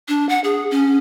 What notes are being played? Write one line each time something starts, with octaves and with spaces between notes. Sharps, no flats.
D4
F#5
G#4
C#4